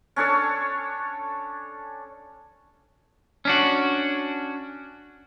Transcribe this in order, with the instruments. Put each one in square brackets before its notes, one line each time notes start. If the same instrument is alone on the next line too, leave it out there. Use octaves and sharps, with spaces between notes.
[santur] C#4 D4 A4 C#5
[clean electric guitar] C#4 D4 F#4